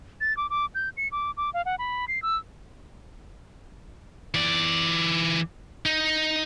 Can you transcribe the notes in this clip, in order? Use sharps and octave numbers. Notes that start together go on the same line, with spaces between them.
A6
D6
D6
G6
C#7
D6
D6
F5
F#5
B5
C7
E6
E3 D5
D#4